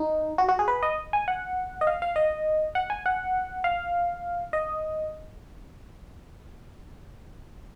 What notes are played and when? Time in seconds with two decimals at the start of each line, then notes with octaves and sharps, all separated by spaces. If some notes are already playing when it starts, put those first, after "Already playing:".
Already playing: D#4
0.38 F#4
0.48 F#4
0.59 G#4
0.68 B4
0.83 D#5
1.13 G#5
1.28 F#5
1.81 D#5
1.87 F5
2.02 F5
2.16 D#5
2.75 F#5
2.90 G#5
3.06 F#5
3.64 F5
4.53 D#5